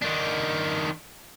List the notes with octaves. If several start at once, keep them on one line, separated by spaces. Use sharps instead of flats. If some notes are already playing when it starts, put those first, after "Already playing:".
D#3 D4